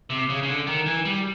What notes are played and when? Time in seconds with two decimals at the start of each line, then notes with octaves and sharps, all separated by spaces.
0.10 C3
0.29 C#3
0.43 C#3
0.48 D3
0.67 D#3
0.86 E3
1.05 G3